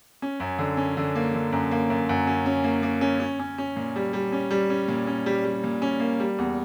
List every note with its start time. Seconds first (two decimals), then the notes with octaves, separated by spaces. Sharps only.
0.22 C#4
0.40 F#2
0.59 D3
0.77 C#4
0.97 D3
1.16 A#3
1.34 D3
1.52 F#2
1.71 A#3
1.90 F#2
2.09 F#2
2.27 C#4
2.46 C#4
2.64 A#3
2.83 A#3
3.01 C#4
3.20 C#4
3.40 C#4
3.58 C#4
3.76 A#2
3.96 G3
4.13 G3
4.32 C#4
4.51 G3
4.70 C#4
4.88 A#2
5.07 C#4
5.26 G3
5.45 G3
5.64 A#2
5.82 C#4
6.00 A#3
6.20 G3
6.38 E2